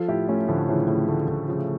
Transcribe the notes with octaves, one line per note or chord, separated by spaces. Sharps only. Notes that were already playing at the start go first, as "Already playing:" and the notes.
Already playing: F3 F4 A4
A2 E4 G4
A3 C#4 E4
A2 D3 F3
C#3 E3 F3
A2 C#3
D3 A3
A2 D3
C#3 F3